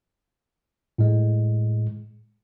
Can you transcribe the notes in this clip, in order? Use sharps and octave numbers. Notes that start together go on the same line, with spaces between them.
A2 G#3